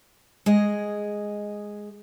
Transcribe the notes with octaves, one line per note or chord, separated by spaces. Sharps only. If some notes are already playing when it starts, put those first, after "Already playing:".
G#3 G#4 D#5